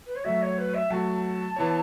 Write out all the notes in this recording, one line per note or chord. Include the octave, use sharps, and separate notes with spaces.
B4
C#5
F#3 A3 F#4 E5
C#5
B4
E5
F#3 A3 F#4 A5
E3 B3 E4 C#5